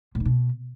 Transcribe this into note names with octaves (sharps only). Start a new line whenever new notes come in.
A2
D#3
B2